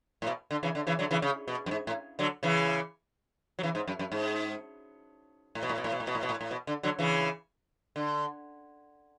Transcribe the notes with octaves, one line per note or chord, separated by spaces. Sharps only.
A2
B2
D3
C#3 E3
D3
C#3 E3
D3 F#3
C#3 E3
C#3
B2
F#2
G#2
A2
D3 F#3
C#3 E3
F#3
C#3 E3
G#2
F#2
F#2
G#2
A2
B2
A2
B2
A2
B2
A2
B2
A2
B2
A2
A2
B2
D3
D3 F#3
C#3 E3
D3